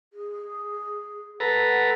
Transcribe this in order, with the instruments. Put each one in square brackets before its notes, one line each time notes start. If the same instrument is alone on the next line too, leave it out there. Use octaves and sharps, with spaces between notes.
[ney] G#4
[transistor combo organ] A4 B4 A#5 [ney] F#5